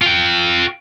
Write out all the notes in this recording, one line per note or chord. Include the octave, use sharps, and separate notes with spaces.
F4 G5